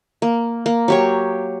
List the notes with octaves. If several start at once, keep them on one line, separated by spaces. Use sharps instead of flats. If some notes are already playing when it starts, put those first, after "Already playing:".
A#3
A#3
F#3 G4 C#5